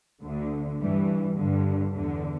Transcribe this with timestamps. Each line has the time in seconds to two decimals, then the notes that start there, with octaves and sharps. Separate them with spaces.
0.24 D2 D3
0.81 G2 E3 G3
1.38 G2 D3
1.95 E2 D3